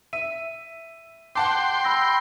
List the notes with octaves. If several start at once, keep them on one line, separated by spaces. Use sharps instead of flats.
E5 D#7
F#5 G5 A5 C6 D6
B5 E6 A#6